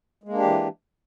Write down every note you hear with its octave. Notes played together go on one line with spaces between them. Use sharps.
E3 G#3 A#3 D4 G4